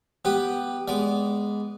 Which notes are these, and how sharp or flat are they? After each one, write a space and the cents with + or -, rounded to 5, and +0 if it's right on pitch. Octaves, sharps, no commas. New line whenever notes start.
B3 +0 G4 +0 B4 +0
G#3 +0 B3 +0 D5 -30